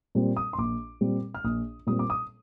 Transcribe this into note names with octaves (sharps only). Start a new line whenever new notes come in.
A#2 G3 C4
D#6
C6
A#1 D6
A#2 G3 C4
F6
A#1 D#6
A#2 G3 C4 D#6
D6
D#6